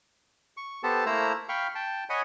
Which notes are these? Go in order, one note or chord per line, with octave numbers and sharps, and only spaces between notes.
C#6
B3 G4 A4 C5 A5
A3 A#3 E4 C5 A#5 E6
F5 G5 B5 C#6
G5 A5
C#5 D#5 F#5 G#5 B5